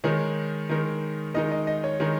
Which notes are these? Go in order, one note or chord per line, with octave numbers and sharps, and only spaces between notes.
D#3 G#3 D#4 A#4 C#5
D#3 G#3 D#4 A#4
D#3 G#3 D#4 A#4 D#5
D#5
D#5
C#5
D#3 G#3 D#4 A#4